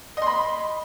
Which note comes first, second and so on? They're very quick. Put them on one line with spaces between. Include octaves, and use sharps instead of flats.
D#5 C6 B5